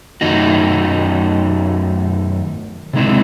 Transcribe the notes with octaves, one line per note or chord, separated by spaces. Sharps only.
F#2 D#3 A3 D#4 F#4
C3 D#3 G#3 C4 E4